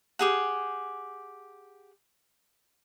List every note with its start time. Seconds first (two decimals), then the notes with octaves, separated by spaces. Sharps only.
0.19 G4 G#4 F#5